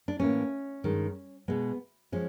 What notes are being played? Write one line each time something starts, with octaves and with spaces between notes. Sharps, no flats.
D4
A2 E3 G3 A#3 C#4
G2 D#3 G#3
B2 G#3 B3
F3 G#3 C#4